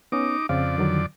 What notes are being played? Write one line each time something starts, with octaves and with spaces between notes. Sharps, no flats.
B3 C#4 D#4 D6
F2 C#3 C4 D5 F5
D3 D#3 F#3